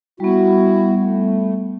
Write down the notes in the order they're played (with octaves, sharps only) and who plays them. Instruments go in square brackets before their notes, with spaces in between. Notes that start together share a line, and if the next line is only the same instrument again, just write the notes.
[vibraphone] G3 B3 [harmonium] E4 F#4
[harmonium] A3